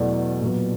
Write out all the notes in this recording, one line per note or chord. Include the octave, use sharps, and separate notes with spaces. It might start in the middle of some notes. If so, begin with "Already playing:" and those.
Already playing: E2 B2 F#3 A3 D5
A#2 F#3 B3